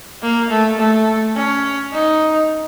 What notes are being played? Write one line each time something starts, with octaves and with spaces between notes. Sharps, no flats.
A#3
A3
A3
C#4
D#4